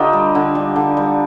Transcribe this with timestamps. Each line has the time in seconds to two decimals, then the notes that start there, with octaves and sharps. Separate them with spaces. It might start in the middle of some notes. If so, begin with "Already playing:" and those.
Already playing: D3 D#4 F4 G4
0.13 G3
0.35 D3
0.55 G3
0.76 D3
0.97 G3